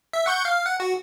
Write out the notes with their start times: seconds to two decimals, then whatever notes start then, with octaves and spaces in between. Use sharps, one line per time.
0.13 E5
0.26 F#5 C#6 G6
0.45 F5
0.65 F#5
0.80 F#4